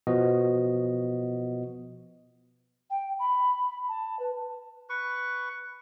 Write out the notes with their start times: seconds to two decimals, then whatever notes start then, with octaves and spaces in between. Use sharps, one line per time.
0.07 B2 F3 B3 F#4 D#5
2.90 G5
3.19 B5
3.89 A5
4.19 B4
4.89 B4 C#6